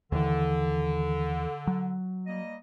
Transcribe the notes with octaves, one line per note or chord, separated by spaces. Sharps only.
D#2 D3 E3
F#3
G3 A#3 D#5